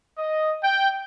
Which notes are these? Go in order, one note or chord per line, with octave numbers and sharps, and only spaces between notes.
D#5
G5